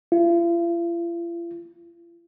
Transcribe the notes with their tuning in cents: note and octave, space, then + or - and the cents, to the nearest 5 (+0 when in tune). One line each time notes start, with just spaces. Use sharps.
F4 -45